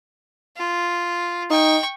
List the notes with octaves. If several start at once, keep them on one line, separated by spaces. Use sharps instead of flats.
F4
D#4 G5 C#6